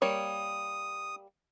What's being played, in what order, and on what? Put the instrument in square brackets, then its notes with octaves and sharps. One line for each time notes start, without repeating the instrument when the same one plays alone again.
[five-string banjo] G3 A#3 C#5 [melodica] D#6